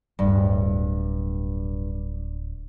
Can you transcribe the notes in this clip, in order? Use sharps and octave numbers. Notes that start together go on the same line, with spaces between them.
D1 G2